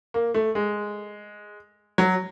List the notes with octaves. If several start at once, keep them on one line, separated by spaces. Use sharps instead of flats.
A#3
A3
G#3
F#3